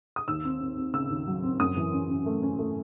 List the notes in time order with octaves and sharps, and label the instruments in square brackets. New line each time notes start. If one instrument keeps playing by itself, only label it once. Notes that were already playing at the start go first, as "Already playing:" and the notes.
[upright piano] D#6
D#2 E6
C4
C4
C4
C#3 E6
D#2
F#3
C4
F#2 D#6
E3
C#4
C#4
A3
C#4
A3